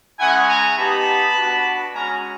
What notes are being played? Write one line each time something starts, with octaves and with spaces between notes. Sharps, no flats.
G#3 C#4 E4 F#5 G#5
G#5 A#5
B3 D#4 G4 A5 B5
B3 D4 F#4
G#3 C#4 F#4 G#5 A#5